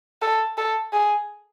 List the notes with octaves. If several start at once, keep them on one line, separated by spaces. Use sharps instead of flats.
A4
A4
G#4